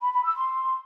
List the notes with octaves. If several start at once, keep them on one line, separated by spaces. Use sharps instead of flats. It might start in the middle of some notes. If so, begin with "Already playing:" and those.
B5
B5
E6
C6